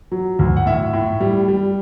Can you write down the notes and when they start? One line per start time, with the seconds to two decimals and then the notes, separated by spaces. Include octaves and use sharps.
0.12 F#3
0.39 D2
0.57 F#5
0.66 A2 E5
0.93 A2
1.20 G3
1.48 G3